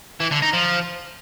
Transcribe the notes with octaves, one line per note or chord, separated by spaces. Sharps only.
E3
D3
D#4
F3